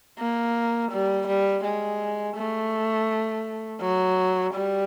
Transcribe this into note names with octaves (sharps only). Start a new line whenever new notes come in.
A#3
G3
G3
G#3
A3
F#3
G3